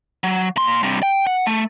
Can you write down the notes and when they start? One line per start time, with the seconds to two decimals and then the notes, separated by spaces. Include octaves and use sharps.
0.24 F#3
0.56 A#2 C6
0.83 G2 C3
1.03 G5
1.27 F#5
1.47 A3